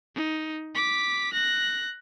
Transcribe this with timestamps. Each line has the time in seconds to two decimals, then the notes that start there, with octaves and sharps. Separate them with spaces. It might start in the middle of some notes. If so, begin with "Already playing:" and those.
0.15 D#4
0.75 D6 B6
1.33 F#6 A#6